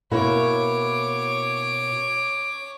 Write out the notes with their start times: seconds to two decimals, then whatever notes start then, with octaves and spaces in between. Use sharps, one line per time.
0.11 B2 A#3 E4 C#5 D6